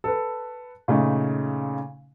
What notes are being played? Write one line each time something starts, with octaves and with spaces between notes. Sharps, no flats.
A4 B4
A#2 C#3 A3 D#4